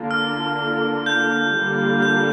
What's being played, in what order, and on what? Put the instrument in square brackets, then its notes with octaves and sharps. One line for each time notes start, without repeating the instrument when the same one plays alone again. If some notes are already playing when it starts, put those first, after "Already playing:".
Already playing: [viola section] D3 A#3 D4 F4
[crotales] F6
G6
[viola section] D3 G3 A#3 F4
[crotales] G6